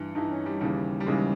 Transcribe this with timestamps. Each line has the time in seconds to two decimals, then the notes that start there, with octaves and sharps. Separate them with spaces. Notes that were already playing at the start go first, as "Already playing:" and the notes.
Already playing: G2 E3
0.15 G2 E3 D#4
0.31 C#4
0.46 G3
0.61 D#2 C#3 E3 G3
1.00 G3
1.07 D#2 C#3 E3 G#3